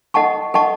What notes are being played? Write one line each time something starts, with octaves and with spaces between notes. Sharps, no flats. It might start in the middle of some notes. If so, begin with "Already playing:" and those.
A4 D#5 F#5 A5 C#6
A4 D#5 F#5 A5 C#6